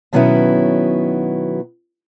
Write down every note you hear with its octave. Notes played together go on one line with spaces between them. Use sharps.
B2 D#3 F#3 B3 C#4 E4